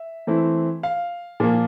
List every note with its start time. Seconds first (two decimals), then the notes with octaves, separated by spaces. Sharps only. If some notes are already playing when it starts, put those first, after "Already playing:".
Already playing: E5
0.27 E3 A3 C4 E4
0.83 F5
1.40 A#2 F3 A#3